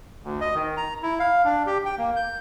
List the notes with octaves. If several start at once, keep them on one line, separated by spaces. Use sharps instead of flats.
D2
D#5
D#3
A#5
E4
F5
D4
G4
G5
A#3
G6